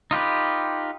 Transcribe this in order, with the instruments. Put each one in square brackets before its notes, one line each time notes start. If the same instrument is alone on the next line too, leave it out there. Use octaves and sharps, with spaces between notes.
[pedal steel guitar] D#4 F4 G4 B4